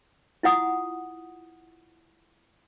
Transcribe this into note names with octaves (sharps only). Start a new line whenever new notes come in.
E4 F4 F#5 D#6